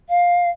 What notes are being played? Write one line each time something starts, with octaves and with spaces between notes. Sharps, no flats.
F5